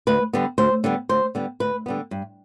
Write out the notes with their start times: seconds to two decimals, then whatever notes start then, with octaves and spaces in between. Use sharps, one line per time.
0.07 D2 B4
0.33 D3 G3 B3
0.58 D2 C5
0.84 D3 G3 B3
1.09 D2 C5
1.35 D3 G3 B3
1.60 D2 B4
1.86 D3 G3 B3
2.11 G2